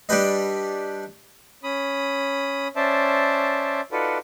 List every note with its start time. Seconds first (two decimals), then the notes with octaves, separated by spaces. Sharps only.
0.09 G3 D4 G4 B4 D#5
1.63 C#4 B5 D#6
2.76 C#4 C5 D5 E5 A5
3.92 D#4 F4 F#4 A4 B4 D5